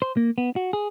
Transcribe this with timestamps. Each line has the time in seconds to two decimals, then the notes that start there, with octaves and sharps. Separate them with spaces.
0.02 C5
0.17 A#3
0.38 B3
0.56 F#4
0.73 G#4